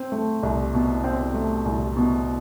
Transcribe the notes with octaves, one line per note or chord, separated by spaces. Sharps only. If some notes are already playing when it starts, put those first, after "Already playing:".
Already playing: C4
A3
C2
B2
C4
A3
C2
B2